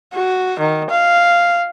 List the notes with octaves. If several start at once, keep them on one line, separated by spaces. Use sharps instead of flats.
F#4
D#3
F5